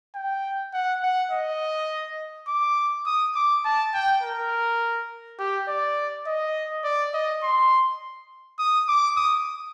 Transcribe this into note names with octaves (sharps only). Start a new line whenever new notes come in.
G5
F#5
F#5
D#5
D6
D#6
D6
A5
G5
A#4
G4
D5
D#5
D5
D#5
C6
D#6
D6
D#6